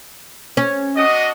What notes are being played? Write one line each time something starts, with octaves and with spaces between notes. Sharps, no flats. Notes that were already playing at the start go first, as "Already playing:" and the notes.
C#4
D4 F#4 D#5